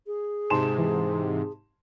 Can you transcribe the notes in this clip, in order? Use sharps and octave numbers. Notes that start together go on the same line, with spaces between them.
G#4
G#2 C3 A5 C6 E7
E3